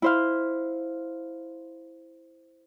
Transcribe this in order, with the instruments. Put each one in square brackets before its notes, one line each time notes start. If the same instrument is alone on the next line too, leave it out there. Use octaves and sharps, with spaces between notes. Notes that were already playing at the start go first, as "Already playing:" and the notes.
[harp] E4 C5 F5